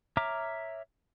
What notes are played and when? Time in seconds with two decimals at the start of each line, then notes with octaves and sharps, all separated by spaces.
0.17 C#5 E5 A#5 D6 F6